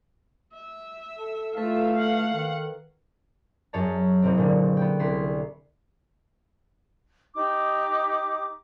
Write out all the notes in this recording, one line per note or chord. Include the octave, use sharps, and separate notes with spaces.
E5
A4
A3 F4 A4 B4 E5 F5
F#5
D#3
F#2 G#4 C#5 A5
F#1 C3 C4
A#2 D3
B3 G5
C2 G#4 C6 B6
D#4 G4 D6